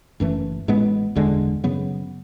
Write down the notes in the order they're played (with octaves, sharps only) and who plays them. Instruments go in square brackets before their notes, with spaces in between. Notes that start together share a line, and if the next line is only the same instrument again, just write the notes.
[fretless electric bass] F#1 F#2 E3 A3
A1 A2 G#3 B3
F#1 E2 D3 G#3
F#2 C#3 F#3 B3